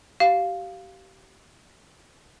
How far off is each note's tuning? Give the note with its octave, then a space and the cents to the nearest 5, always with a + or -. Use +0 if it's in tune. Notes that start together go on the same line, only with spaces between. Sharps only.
G4 -30 F5 +0